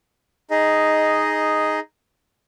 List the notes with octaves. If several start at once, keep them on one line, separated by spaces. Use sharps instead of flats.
D#4 G#4 D#5